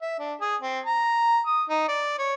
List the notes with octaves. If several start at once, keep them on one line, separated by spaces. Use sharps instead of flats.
E5
D4
G#4
C4
A#5
D#6
D#4
D5
C#5